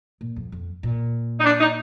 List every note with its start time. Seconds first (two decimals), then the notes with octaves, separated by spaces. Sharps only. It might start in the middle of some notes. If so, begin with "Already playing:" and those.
0.21 A#2
0.36 F2
0.52 F2
0.83 A#2
1.39 D#4
1.44 D4
1.60 D#4